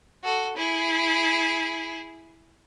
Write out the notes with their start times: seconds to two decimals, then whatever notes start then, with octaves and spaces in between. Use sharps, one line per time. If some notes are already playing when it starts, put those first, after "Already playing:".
0.23 F#4 A4
0.56 E4 G#4